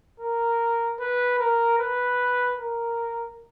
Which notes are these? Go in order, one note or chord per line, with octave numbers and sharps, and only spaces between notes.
A#4
B4
A#4
B4
A#4